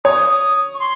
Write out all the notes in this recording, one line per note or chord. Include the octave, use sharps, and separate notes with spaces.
C#5 D#6
D#6
C#6
C6